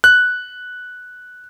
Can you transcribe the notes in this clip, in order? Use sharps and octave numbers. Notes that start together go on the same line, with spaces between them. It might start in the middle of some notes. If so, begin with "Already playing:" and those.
F#6